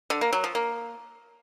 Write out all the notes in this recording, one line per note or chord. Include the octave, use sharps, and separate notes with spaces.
D3
A#3
F#3
F3
A#3